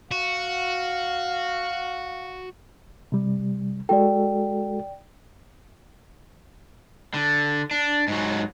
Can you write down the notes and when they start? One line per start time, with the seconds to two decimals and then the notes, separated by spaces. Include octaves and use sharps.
0.11 F#4 F5
3.12 C3 G3
3.89 G#3 F#4 A4 D5 G5
7.14 D3
7.71 D4
8.08 G#2 F#3